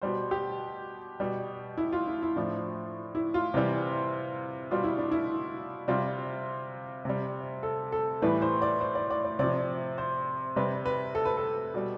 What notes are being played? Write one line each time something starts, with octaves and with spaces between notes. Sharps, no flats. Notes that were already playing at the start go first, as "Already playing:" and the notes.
B2 G3 C5
G4
B2 G3
E4
F4
E4
E4
A2 F3 D4
E4
F4
C3 E3 G3
B2 G3 F4
E4
D4
E4
C3 G3 F4
C3 G3
A4
A4
A2 E3 G3 B4
C5
D5
C5
D5
D5
D5
C3 F3 D5
C5
C3 G3 B4
B4
A4
B4
A4
B2 G3